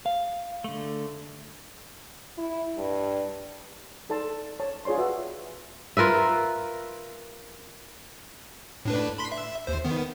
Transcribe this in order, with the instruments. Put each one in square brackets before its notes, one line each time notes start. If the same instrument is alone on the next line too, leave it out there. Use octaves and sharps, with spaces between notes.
[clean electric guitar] F5
[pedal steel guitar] D3 A3
[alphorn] E4
G2
[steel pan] D#4 A4 D5 A5 C6
C#5 A5
F4 G#4 C#5 D5 C6
F#4 B4 E5
[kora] F4 A#4 B4 E5
[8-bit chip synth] A2 D4 B4
B5 C6 B6
E5
D#2 C5
D#3 B3